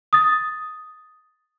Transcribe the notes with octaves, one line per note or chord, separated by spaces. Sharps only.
D#6 A6